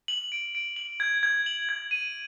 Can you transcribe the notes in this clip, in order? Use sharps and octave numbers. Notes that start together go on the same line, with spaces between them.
F#7
D7
D7
F#7
G#6
G#6
F#7
G#6
D#7